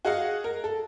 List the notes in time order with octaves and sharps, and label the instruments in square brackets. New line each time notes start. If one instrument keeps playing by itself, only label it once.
[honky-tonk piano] F#4 G#4 D#5 F5 F#5
A#4
A4